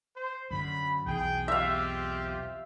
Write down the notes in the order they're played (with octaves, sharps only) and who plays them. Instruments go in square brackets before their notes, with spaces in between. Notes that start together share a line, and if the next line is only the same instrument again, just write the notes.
[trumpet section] C5
[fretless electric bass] F#2 D3 [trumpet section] B5
[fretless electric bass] B1 E2 [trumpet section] G#4 G5
[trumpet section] C4 F4 G4 [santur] E5 F5